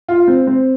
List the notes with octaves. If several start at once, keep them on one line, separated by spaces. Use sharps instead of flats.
F4
C4
C4